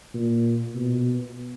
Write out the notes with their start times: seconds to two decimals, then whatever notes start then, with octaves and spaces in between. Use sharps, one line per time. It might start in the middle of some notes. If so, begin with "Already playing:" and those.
0.14 A#2
0.75 B2